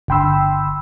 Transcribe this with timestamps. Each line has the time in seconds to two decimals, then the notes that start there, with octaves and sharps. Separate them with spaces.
0.08 G1 D3 G5 B5 C6 E6